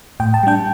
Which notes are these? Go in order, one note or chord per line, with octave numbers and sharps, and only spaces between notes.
A2 G5
A5
G3 D4 G5